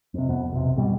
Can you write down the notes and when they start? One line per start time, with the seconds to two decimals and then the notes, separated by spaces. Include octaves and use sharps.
0.14 F2 C3
0.29 F2 B3
0.53 B1 C3
0.77 F2 G#2 B2 G3